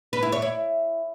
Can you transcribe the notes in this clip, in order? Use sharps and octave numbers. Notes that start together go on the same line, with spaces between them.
B4
E4
C#5
E4